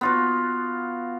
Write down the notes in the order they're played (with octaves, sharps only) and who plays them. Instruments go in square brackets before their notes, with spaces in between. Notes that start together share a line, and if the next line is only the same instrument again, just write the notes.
[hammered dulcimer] B3 F4 F#4